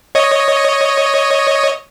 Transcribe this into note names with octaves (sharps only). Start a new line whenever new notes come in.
C#5 D#5